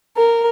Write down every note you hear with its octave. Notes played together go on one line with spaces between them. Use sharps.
A#4